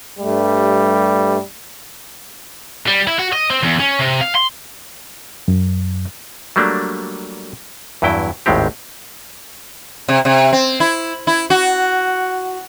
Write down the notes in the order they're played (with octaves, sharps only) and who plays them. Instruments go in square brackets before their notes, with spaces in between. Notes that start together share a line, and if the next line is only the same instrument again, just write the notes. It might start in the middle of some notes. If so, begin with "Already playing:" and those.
[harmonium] G2 A3 [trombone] G3
[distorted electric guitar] G3
E4
F#4
D#5
C4
E2
C#4
C3
F5
C6
[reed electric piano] F#2
[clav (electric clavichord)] F#3 G3 A3 A#3 D4
E2 G2 F#3 E4 G5
G#1 D#2 A2 G#3 C4 G4
[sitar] C3
C3
C4
E4
E4
F#4